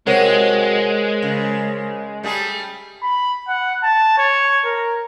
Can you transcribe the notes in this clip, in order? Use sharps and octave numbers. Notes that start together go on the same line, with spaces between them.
C3 F#3 G#3 F#4 A#4 C5 C#5
C#3
G3 A3 G#4
B5
F#5
A5
C#5
A#4